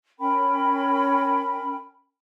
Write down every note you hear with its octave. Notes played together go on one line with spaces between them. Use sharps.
C#4 A#4 G5 B5